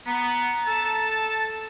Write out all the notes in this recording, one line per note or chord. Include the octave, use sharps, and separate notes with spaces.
B3 A#5
A4 A5